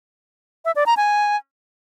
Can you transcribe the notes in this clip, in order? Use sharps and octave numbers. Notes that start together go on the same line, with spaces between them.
E5
D5
A#5
G#5